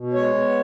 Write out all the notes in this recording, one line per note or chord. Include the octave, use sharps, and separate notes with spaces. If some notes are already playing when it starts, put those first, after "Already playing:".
Already playing: B2
G#3 C#5
B3